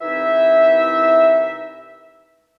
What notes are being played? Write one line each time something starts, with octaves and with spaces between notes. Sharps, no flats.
C2 E3 C4 D#4 E4 E5